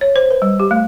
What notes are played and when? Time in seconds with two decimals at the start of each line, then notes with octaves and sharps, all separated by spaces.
0.01 C#5
0.16 C5
0.31 B4
0.42 G3
0.60 G4
0.71 A3